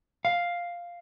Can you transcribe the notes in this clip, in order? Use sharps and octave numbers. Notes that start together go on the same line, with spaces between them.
F5